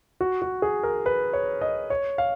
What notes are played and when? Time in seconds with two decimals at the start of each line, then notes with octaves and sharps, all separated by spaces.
0.21 F#4
0.42 F#4
0.62 G#4
0.83 A#4
1.06 B4
1.33 C#5
1.61 D#5
1.90 C#5
2.18 F5